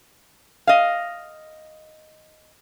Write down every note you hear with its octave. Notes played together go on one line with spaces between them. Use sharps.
D#5 F5